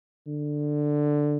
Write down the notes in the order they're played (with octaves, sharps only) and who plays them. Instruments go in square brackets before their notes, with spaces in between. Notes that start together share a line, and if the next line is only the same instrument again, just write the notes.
[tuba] D3